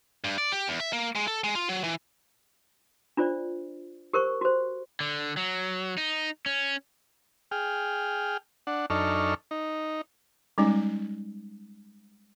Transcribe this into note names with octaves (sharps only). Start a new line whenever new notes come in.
G2
D5
G4
E2
E5
A#3
G#3
A4
G#3
F4
F#3
E3
D4 F4 C5 D5
G4 A#4 C5 C#6
F#4 C5
D3
F#3
D#4
C#4
G#4 G5 F6
D4 F#5
F#2 D4 D#4 A4 C#6 F6
D#4
G3 G#3 C#4 D#4